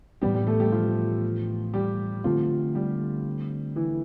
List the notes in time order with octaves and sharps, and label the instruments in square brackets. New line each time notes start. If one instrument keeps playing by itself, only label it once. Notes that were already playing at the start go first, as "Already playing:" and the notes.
[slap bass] A2 E3 B3 D4 [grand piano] G3 G4
[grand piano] G3 G4
A3 A4
G3 G4
F3 F4
G3 G4
[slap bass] D3 A3 C4 [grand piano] F3 F4
[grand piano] G3 G4
E3 E4